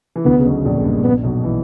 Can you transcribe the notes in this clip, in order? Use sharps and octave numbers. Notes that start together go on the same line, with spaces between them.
E3
D2 D3 B3
C#3
B1 B2
A#1 A#2
A#2
G2
A#1 A#2 B3
B1 B2
E3